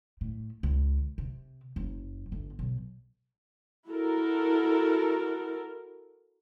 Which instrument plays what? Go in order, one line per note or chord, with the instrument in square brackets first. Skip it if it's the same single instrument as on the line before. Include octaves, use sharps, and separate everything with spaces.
[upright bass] A2
C#2
C3
F#1
G1
B1
[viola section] E4 F#4 A4 A#4